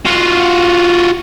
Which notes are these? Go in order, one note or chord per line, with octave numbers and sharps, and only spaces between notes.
F4 F#4